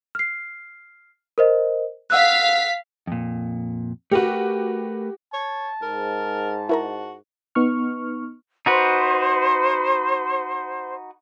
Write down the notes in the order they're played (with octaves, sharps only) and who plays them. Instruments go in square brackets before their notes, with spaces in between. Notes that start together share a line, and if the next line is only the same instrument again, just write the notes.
[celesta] F6 C7
A#4 C5 D#5
[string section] F5 B6 [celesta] F#5 E6 F#6
[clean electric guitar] F2 A#2
[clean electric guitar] A3 A#4 B4 [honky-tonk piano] F#4 G4
[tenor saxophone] C#5 [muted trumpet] A5
[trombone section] G#2 [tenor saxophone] A#4
[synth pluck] E4 A#4 A#5 [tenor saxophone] F#4
[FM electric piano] B3 D#4 C#6 F6
[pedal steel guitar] D#4 F#4 B4 [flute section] C5